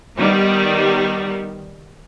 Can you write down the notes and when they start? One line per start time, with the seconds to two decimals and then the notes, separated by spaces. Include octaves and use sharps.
0.17 D#3 G3 B3